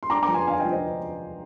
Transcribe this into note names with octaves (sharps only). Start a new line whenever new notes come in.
C6
D4 A#5 D6
A#5 D6
F3
G#5 C6
D4 F5 G#5
D#5 G5
F3
C5 D#5